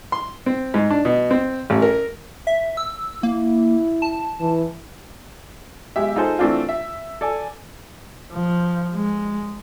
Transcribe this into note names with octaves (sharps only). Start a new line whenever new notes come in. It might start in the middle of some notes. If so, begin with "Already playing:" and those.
C6
C4
G#2
D4
B2
C4
A1
A#4
E5
E6
A#3 E4
A5
E3
B1 G#3 G4 E5
D#4 F4 G#4 A4 C5
E3 A3 C4 D4 F4
E5
A4 D5 G#5
F3
G#3